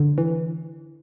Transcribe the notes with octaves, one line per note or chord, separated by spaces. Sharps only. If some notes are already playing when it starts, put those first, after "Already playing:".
Already playing: D3
E3